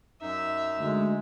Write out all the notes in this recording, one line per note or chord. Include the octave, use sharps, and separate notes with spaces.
F#2 D#4 E5
D2 G#3